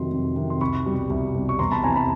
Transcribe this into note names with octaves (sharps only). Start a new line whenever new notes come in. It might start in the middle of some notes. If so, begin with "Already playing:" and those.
Already playing: F2 C3 D#3 F#3 C6
F2
C3 D#3 F#3
C6
C2 B5 C#6
B2 G3
C2
B2 G3
C#6
E2 A#5 C6
A5 B5
C3 E3 G#5 A#5
A5 B5